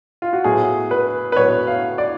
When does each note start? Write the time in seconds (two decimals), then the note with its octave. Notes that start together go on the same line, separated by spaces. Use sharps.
0.22 F4
0.33 F#4
0.44 A2 F#3 B3 G#4
0.91 B4
1.32 B4
1.37 A2 F#3 B3 C#5
1.67 F5
1.98 D5